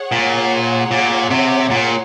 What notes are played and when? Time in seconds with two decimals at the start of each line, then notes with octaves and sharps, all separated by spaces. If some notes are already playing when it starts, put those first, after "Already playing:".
Already playing: G#4 C#5 F#5
0.12 A#2
0.91 A#2
1.30 C3
1.71 A#2